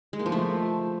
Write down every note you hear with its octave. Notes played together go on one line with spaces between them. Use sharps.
G#3
A#3
F3
A3